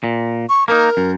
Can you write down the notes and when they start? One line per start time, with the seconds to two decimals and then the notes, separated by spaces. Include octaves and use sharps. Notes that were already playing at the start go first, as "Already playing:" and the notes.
0.04 A#2
0.49 C#6
0.68 A#3 C#4 D#4 A#4
0.97 F#2